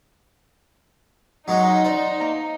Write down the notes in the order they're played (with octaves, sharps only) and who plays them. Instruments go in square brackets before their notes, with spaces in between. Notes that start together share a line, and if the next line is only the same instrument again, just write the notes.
[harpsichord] F#3 G#3 C#4 [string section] D#4
[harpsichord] C5 [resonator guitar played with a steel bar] D5 F#5
[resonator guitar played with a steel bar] A#3 A#5